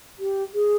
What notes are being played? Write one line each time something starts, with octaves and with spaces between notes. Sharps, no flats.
G4
G#4